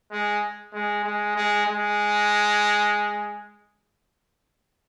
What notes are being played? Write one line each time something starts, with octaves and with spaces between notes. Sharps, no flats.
G#3
G#3
G#3
G#3
G#3